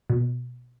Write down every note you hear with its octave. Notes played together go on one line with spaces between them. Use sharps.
B2